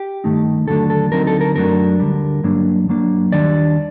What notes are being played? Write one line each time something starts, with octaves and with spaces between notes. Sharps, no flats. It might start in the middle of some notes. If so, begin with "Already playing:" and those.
Already playing: G4
G2 D#3 A3 D#4
D#2 D3 F#3 A3 D4 A4
A4
D2 D3 F#3 C4 D#4 A#4
A4
A#4
F#2 F#3 A3 D4 A#4
D2 D3 G3
G2 F#3 A#3 D4
G2 F#3 A#3 D4
D#2 D#3 G3 D4 D5